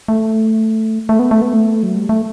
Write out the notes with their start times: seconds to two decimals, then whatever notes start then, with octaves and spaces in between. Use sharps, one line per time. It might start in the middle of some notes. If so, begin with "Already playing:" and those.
0.08 A3
1.09 A3
1.19 B3
1.31 A3
1.42 B3
1.53 A3
1.83 F#3
1.96 G3
2.09 A3